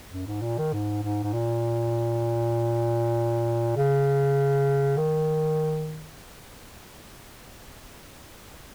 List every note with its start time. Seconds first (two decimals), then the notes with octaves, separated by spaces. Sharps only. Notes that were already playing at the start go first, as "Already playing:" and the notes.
0.12 F#2
0.27 G#2
0.42 A#2
0.58 D#3
0.73 G#2
1.03 G#2
1.23 G#2
1.33 A#2
3.76 C#3
4.97 D#3